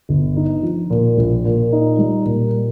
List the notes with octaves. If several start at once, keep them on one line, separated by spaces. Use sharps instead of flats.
G1
D#4
F3
A#2
A#1
A#2
D#4
G3
A#2